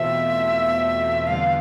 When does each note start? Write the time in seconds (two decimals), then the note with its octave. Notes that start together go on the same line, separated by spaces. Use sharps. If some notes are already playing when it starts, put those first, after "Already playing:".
Already playing: E2 B2 A3 C4 F4 E5
1.27 E2 D3 G3 B3 F4 F5